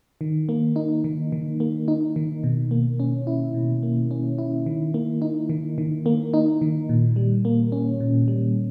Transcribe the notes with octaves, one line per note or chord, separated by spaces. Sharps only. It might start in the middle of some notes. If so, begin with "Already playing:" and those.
D#3
A#3
D#4
D#3
D#3
A#3
D#4
D#3
B2
A#3
C#4
E4
B2
A#3
C#4
E4
D#3
A#3
D#4
D#3
D#3
A#3
D#4
D#3
A#2
G3
A#3
C#4
A#2
G3